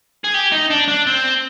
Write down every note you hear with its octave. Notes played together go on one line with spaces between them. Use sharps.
G#4
G4
D#4
D4
D4
C4